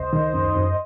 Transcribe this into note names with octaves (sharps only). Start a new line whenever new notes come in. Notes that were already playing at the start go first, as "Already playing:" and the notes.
Already playing: C#2 C5 D#5
D#3
F#2
F#2